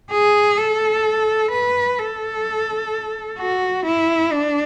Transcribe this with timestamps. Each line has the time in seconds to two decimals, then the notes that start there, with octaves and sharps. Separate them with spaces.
0.11 G#4
0.57 A4
1.51 B4
1.99 A4
3.39 F#4
3.86 E4
4.32 D4